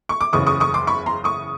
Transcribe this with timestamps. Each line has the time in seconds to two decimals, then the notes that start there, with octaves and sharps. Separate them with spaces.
0.09 C#6
0.21 D6
0.33 F#1 E2 C#3 C#6 D#6
0.46 C#6 D#6
0.60 C#6 D#6
0.74 C6 D6
0.87 B5 C#6
1.06 A#5 C6
1.24 C#6 D#6